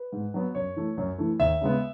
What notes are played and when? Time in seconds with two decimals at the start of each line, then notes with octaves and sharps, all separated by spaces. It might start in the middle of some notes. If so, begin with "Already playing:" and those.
Already playing: B4
0.12 G#2
0.34 F#3 B3
0.55 F#2 C#5
0.76 E3 A3
0.97 F#2
1.18 E3 A3
1.39 D#2 E5
1.61 C#3 G#3 B3